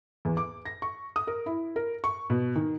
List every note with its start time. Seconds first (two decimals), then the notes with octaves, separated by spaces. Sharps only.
0.25 E2
0.37 D6
0.65 A#6
0.82 C#6
1.16 D#6
1.27 A#4
1.46 E4
1.76 A#4
2.04 C#6
2.30 B2
2.56 D#3